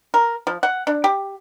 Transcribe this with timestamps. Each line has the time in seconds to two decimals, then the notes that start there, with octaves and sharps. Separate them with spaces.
0.14 A#4
0.47 F3
0.63 F#5
0.87 D4
1.04 G4